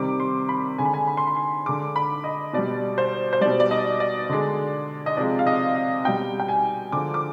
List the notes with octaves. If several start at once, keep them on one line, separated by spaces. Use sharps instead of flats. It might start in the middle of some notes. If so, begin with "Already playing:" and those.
Already playing: C3 D#3 G3 D6
C6
B5
D3 G#3 G#5
B5
G#5
B5
C6
B5
C6
D3 G#3 D6
B5
D#5
B2 G3 D5
C5
C5
B2 G3 D5
D5
D#5
D5
D3 G#3
D#5
C3 F3 G#3 D5
F5
D#5
F5
B2 G3 G5
G5
G#5
D3 F3 G#3 D6
D6